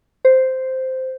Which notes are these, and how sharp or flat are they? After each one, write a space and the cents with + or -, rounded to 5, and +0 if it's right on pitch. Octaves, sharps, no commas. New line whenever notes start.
C5 -5